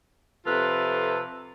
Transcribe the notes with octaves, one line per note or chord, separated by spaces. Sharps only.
F2 C3 F4 A4 B4